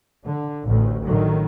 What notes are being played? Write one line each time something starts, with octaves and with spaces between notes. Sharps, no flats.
D3
A1 D2 A2
A2 D3 D#3 F#3